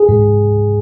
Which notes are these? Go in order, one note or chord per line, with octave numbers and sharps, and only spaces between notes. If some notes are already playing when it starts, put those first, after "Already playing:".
Already playing: G#4
G#2